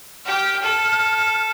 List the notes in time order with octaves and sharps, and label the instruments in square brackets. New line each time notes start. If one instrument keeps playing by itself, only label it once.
[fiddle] G4 G5 [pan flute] F6
[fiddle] A4